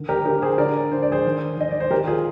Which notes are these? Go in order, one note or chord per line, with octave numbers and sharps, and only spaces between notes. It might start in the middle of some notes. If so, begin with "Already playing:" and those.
Already playing: D3 D#3
G4 A#4
D3 G4 A#4
G#4 C5
D3 A#4 D5
D3 C5
D5
G#4 C5
D#3
D#3 D#5
D5
C5
D#3 G4 A#4
F4 G#4